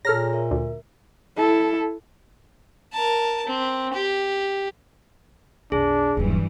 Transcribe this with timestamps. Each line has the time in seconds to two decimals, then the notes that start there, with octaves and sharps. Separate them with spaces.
0.05 A#2 G#4 A4 C#5 A#5 F6 A#6
0.33 A#4 E5
0.51 D2
1.36 E4 A4
2.93 A#4 A5
3.46 C4
3.93 G4
5.72 B1 F2 D4 G#4
6.17 D#1 G2 E3 F#3